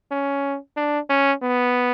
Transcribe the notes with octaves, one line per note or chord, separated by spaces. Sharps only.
C#4
D4
C#4
B3